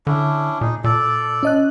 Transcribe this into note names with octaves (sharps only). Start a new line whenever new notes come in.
D3 C#4 D4 E4
A#2 D#4 G#4
A#2 A4 D5
C#4 D#5 F#6